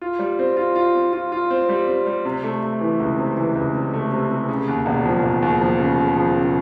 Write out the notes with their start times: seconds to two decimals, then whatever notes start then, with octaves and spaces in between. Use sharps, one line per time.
0.01 F4
0.19 G3
0.39 C4
0.57 F4
0.76 F4
0.95 C4
1.13 F4
1.32 F4
1.50 C4
1.69 G3
1.88 C4
2.06 G3
2.25 C3
2.44 A3
2.63 A3
2.81 E3
3.00 C#2
3.18 C3
3.37 E3
3.55 C#2
3.74 C3
3.94 A3
4.12 C3
4.31 C3
4.49 C#3
4.68 D#2
4.86 E1
5.06 F3
5.23 E1
5.42 D#2
5.61 F3
5.79 C#3
5.99 C#3
6.16 F3
6.36 C#3